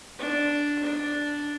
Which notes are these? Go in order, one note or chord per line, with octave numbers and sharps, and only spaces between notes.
D4
D4